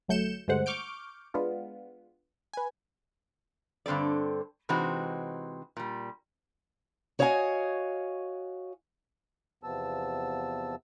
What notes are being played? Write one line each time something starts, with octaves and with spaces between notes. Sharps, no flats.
G1 F#3 A3 G6 C#7 E7
D2 G2 G#3 A3 C5 F#5
C#6 D6 F6 G6 D7
G#3 B3 D4 F4
B4 G#5
G2 D3 C4 A4 D5
C3 E3 G#3 C4 D#4 F#4
A#2 G3
F#4 C#5 D#5 F5 G5 G#5
E2 C3 F3 B3 A5 E6